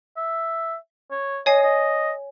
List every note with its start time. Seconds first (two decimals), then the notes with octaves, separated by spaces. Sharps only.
0.17 E5
1.11 C#5
1.46 C#5 D#5 G#5 C7
1.63 D#5